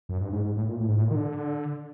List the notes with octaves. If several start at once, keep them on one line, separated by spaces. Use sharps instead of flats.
F#2
G2
G#2
G#2
A2
A#2
A2
G#2
A2
A#2
D#3
D3